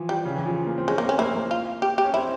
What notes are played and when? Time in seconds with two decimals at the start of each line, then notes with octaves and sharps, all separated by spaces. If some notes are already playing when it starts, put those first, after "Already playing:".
Already playing: E3 F3
0.09 G3
0.25 C#3
0.36 E3
0.46 F3
0.67 A#3
0.78 C4
0.87 G#3 C#4
0.98 A#3
1.03 C4
1.09 C#4
1.19 A#3 E4
1.35 A#3
1.51 F4
1.82 G4
1.98 G4
2.04 C#4
2.13 C4 E4